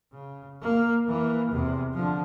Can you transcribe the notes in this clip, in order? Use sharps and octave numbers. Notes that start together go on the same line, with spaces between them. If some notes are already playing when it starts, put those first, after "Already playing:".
C#3
A#3
E3 A#3
E2 C3
D3 F3